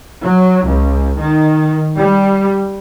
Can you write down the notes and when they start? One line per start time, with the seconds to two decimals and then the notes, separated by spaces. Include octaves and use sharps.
0.23 F#3
0.67 C#2
1.19 D#3
1.98 G3